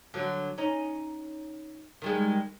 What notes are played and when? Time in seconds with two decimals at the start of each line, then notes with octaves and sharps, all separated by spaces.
0.14 D3 F#3
0.58 C#4 D#4
2.02 D#3 G3 G#3